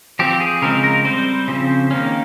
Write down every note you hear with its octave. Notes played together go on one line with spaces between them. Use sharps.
F3 C4 G4
G#4
C#3 F3 G#3 C4 A#4
A#4
G3 C4 C5
C#3 F3 C4
D#3 A#3 C#4